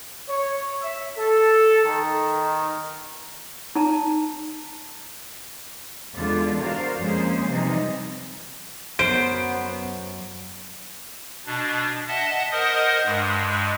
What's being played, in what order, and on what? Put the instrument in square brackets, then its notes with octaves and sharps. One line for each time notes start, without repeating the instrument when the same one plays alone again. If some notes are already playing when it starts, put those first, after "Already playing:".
[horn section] C#5
E5
A4
D#3
[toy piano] D#4 A5 A#5
[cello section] E2 D3 G#3 D4 F4
F#4 A#4 C5 D5 F5
F2 G#3 A#3 C#4 G#4 C5
C3 E3 F3 G3 D#4
[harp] F#2 [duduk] B3 [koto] C5 [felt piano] D7
[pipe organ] B2 D4
D#5 E5 F#5 A5
A#4 C5 D#5 F#5 D#6
G2 G#3